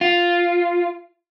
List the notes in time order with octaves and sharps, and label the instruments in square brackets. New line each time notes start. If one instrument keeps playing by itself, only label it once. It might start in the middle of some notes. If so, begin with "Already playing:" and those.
[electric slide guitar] F4